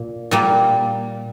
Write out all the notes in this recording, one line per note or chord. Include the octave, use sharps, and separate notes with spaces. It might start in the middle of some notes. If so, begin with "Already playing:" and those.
Already playing: A#2
A#2 G3 A#3